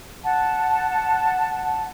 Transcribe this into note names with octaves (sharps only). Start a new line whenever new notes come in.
F#5 A5